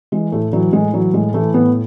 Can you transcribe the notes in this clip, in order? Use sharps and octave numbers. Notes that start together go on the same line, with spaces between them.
E3 G#3
A2 A3
E3 F#3
A2 G#3
E3 F#3
A2 G#3
E3 A3
A2 B3